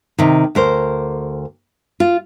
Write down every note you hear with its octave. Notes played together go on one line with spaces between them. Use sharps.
C3 D#3
D2 A#4 C5
F4